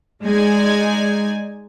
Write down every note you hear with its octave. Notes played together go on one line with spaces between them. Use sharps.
G#3 D#4 D5 G#5 G#6